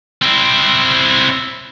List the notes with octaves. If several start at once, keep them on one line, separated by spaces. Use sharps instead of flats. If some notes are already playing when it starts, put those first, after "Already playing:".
C4 E4